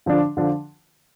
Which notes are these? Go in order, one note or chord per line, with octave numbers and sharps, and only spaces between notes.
D3 F3 D4
D3 F3 D4